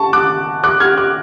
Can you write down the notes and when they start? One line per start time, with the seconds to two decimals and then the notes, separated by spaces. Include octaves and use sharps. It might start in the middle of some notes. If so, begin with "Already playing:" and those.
Already playing: A5 C#6
0.13 D6 F#6
0.64 D6 F#6
0.80 F6 G#6
0.97 D6 F#6